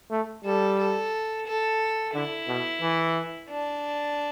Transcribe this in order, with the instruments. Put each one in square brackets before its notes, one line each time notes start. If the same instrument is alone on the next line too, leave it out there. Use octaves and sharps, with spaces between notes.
[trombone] A3
[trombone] G3 [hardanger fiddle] A4
[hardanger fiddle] A4
A4
[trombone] D3 [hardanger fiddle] E4
[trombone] B2
E3
[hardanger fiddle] D4